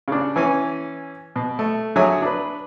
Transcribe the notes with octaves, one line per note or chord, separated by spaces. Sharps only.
C#3 D4
E3 C#4 G#5
B2
A3
D3 F#3 G#4 C#5 E5 G#5
D4 B4